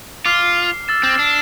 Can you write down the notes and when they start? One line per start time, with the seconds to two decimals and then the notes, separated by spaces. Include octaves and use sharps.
0.25 F4 D6 F6 C7
0.88 E6 A6 E7
1.03 C4
1.19 D4